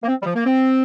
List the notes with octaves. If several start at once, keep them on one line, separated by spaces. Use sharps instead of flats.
A#3
C4
G3
F3
A#3
C4